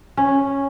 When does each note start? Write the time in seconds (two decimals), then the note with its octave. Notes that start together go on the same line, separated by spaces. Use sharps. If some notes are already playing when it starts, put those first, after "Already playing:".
0.17 C#4